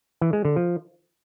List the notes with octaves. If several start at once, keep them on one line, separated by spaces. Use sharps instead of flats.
E3
G#3
D3
F3